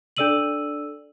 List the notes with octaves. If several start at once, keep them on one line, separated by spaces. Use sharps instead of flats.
D4 A4 D5 E6 D#7 F#7